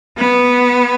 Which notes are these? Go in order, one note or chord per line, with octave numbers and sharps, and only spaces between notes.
B3